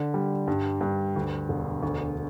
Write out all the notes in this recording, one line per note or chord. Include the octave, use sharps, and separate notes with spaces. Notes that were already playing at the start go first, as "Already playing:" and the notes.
Already playing: D3
G3
G2
G2
D2
E1
D2